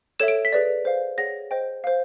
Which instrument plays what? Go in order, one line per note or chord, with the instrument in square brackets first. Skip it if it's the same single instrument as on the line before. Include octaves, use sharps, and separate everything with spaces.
[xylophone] A4 C#5 E5 E7
D7
B6
G#4 B4 D5
C5 F5
G#4 C#5 F#5 A#6
C5 D#5 G5
C5 F5